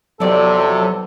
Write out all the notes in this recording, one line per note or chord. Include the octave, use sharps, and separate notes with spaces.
F2 C3 E3 F#3 B3 A4 D5